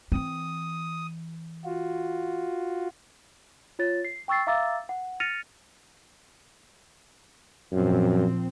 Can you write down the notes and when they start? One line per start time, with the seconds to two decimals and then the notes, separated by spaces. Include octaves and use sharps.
0.12 E3 C4 D#6
1.65 F4 F#4
3.79 F4 C#5 A6
4.05 C7
4.28 G5 C#6 E6 A6 C7
4.47 E5 F5 A#5 D6 E6 A6
4.89 F#5
5.20 F6 A6 A#6 C#7 D#7 F7
7.72 F#2 A#2 F3 C4